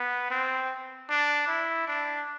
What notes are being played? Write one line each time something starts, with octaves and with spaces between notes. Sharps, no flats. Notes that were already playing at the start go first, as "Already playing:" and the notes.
Already playing: B3
C4
D4
E4
D4